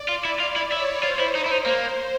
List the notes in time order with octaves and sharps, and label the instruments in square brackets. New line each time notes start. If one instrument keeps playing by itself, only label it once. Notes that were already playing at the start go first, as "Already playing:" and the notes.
Already playing: [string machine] D5
[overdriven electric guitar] F4
E4
[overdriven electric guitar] F4 [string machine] D5
[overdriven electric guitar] E4
[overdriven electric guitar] E4 [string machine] C#5
[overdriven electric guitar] F4 [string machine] C5
[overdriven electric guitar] E4
D#4
E4
D#4
A#3